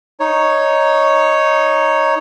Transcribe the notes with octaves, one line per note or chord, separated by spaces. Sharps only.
D#4 C#5